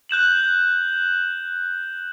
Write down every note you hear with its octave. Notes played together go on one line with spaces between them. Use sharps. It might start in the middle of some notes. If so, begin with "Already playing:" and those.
F#6 G6 E7 F#7